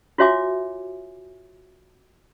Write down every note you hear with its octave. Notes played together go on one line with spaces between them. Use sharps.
F4 F#4 C#5 E5 G#5 D6